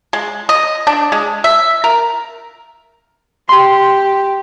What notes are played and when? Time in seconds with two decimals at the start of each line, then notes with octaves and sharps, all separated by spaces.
0.13 G#3
0.49 D#5
0.87 D4
1.12 G#3
1.44 E5
1.84 A#4
3.49 G4 C6